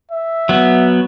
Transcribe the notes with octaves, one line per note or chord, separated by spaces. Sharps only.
E5
F#3 B3